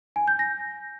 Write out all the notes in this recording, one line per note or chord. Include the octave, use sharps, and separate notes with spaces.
G#5
G6
A#6